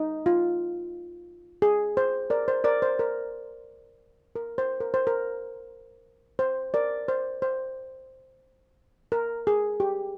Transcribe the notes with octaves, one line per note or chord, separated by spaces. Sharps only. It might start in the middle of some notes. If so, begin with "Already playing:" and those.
Already playing: D#4
F4
G#4
C5
A#4 D5
C5
A#4 D5
C5
A#4
A#4
C5
A#4
C5
A#4
C5
A#4 D5
C5
C5
A#4
G#4
G4